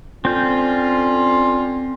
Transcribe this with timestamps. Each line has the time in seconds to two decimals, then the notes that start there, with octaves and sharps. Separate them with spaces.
0.25 D3 C4 C#4 F4 G6